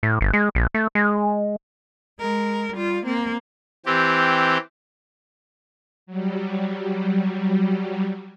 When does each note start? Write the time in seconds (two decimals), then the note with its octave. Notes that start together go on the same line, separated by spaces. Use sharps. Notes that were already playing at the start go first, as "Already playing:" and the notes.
0.03 A2
0.21 G1
0.33 G#3
0.55 A#1
0.74 A3
0.95 G#3
2.20 G#3 A#4
2.73 G3 F4
3.05 A#3 C4
3.86 E3 C4 G4
6.07 F#3 G3